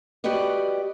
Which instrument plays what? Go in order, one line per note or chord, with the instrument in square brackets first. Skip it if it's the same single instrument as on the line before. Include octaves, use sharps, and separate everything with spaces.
[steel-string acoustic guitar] F#4 G4 B4 D5 D#5